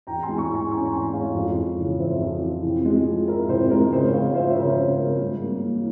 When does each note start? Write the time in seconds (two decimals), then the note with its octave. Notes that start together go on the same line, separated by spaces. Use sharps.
0.07 E2 G5 A#5
0.23 G#5 C6
0.28 G#3
0.38 A#5 C#6
0.49 E3
0.55 G#5 C6
0.71 C#4 A#5 C#6
0.88 A#5
0.92 E2 G#5 C6
1.13 G#3 C#5 F5
1.35 F2
1.57 E3
1.79 C#3
1.99 F2 C5 E5
2.21 F2
2.42 E3
2.64 C3
2.85 G#3
3.06 F3
3.28 E4 A#4
3.49 C3 C5
3.70 G#3 A#4
3.92 C#3 C5
4.13 G#3 C#5 F5
4.35 F3 C5 E5
4.50 E5
4.56 C#3 A#4 C#5
4.70 C5
4.78 C#3 A#4
4.99 G#3 A#4
5.20 G2
5.42 A#3
5.63 E3